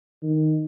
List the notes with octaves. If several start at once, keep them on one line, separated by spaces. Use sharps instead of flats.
D#3